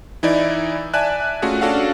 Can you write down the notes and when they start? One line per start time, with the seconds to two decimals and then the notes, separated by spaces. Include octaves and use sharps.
0.23 E3 D#4 E4 D5
0.94 D5 E5 G#5 A5 F#6
1.42 A3 C#4 F4 F#4 G#4
1.61 C#4 D4 F#4 A4 F5 F#5